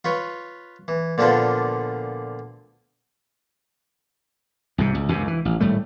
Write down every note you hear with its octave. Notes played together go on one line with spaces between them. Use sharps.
F4 B4 C#5
E3
A#2 D3 F3 B3 D4 F4
C2 G#2 C3
C#2
C#2 F#2 C3
E3
A1
G#1 A2 G3 A3